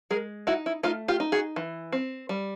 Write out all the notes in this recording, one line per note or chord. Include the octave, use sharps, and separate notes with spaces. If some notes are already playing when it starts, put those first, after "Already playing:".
G#3 G#4 A#4
D#4 E4 F#4
E4
A3 D#4 F4
F4 G4
D#4
F#4 G#4
E3
C4
G3